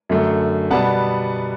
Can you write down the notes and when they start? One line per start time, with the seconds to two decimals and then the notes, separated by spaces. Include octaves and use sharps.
0.09 F#2 D3 A3
0.70 B2 G3 B3 F#5 A5